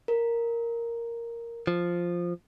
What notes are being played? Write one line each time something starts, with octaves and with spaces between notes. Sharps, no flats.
A#4
F3